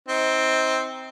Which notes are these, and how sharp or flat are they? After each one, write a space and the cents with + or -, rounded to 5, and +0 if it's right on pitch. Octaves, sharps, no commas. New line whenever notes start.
C4 +5 D#4 +35